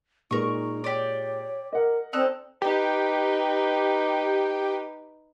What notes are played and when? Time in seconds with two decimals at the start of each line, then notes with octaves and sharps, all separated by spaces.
0.31 A#2 G#3 D#4 A#4 C#6
0.84 G4 C#5 D5
1.73 A#4 D#5 F#5
2.13 C4 D#4 A4 D5 F#6
2.62 D#4 G4 B4